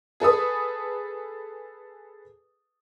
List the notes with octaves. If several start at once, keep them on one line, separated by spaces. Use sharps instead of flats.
G#4 A4 B4 D#6